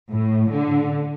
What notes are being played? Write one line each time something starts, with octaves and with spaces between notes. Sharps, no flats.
A2
D3